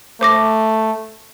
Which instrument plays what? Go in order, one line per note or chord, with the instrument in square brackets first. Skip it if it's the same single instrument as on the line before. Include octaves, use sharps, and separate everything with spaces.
[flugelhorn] A3 [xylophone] C5 D6 A#6